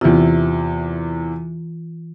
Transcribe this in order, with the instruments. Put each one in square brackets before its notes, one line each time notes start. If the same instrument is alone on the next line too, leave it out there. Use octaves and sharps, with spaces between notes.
[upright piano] E2 C3 [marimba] E3 F4